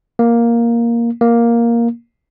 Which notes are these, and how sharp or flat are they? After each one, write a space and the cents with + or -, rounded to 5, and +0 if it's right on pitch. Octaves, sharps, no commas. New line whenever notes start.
A#3 +5
A#3 +5